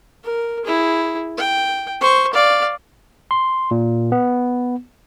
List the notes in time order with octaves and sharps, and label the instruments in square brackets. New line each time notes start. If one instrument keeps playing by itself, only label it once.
[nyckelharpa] A#4
E4 G#4
G5
C5 C#6
D5 F5
[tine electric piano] C6
A#2
B3